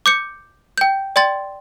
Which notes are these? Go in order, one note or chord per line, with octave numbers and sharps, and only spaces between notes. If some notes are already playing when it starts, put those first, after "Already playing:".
D6 G6 C#7
G5 G6
D5 G5 C6 A6